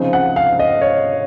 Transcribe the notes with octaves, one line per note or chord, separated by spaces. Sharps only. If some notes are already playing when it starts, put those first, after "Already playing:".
Already playing: C#3 F3 C4 D#4
F#5
F5
D#5
C#5